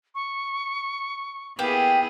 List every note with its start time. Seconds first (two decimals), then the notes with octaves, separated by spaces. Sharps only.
0.15 C#6
1.59 A#3 B3 E4 G4 G#4 G5